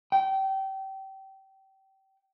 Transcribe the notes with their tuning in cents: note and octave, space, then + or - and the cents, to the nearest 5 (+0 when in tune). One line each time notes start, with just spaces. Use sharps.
G5 -25